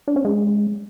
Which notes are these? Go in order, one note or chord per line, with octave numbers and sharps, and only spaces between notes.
D4
C#4
G#3